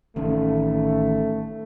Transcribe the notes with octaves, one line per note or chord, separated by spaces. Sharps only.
A1 D#3 A3 C#4